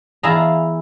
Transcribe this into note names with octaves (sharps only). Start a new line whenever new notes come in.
E2 E4 G#4 F5 A5 A#5